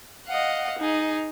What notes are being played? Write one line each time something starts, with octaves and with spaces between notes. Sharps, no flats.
D#5 F5 F#5
D#4 G#4